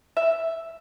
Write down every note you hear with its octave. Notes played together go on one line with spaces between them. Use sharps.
E5